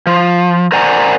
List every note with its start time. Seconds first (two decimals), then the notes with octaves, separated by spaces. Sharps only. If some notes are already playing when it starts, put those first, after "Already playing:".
0.07 F3
0.72 A#4 C5 D5 F#5 G#5 A#5